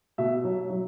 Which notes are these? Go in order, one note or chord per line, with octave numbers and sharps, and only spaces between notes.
B2 E5
F#3
F#3